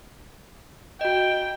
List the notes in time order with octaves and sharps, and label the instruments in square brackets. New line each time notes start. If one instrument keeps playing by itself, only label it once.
[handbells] F#4 D#5 [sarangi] G5